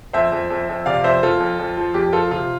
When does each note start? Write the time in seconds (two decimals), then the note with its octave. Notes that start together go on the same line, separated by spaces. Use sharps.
0.13 F2 C5 E5
0.32 F2
0.50 F2
0.69 F2
0.86 C3 D5 F5
1.04 F2 C5 E5
1.23 F2 F4 A4
1.40 F2
1.59 F2
1.77 F3
1.94 F2 G4
2.13 F3 F4 A4
2.31 C3 F4